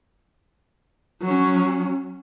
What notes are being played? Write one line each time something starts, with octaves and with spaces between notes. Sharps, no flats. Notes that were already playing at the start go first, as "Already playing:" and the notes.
F#3 C#4